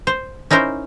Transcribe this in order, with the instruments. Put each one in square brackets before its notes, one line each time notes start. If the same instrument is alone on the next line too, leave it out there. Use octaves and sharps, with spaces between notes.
[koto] C5
C#4 D#4 E4 A#4 C5